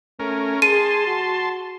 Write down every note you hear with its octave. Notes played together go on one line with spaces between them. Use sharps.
A3 C#4 A#4
G#4 A5 C6 D#7
F#4